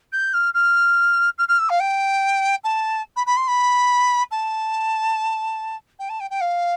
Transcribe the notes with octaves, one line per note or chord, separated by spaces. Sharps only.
G6
F6
F6
F6
F6
E6
F5
G5
A5
B5
B5
C6
B5
A5
G5
A5
G5
G5
F5